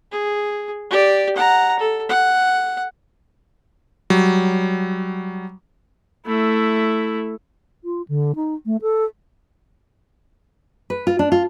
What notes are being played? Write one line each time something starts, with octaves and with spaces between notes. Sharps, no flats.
G#4
G4 D5
F#5 A#5
A4
F#5
F#3 G3
A3 E4
F4
D3
D#4
A3
A4
B4
F4
D4
F4